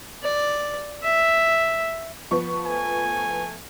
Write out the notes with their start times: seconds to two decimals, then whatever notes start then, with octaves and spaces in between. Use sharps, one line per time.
0.23 D5
1.03 E5
2.31 F3 B3 C#6
2.66 A3 G#5